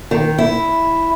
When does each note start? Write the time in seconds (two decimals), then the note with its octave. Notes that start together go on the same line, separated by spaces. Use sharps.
0.11 D#3
0.38 E4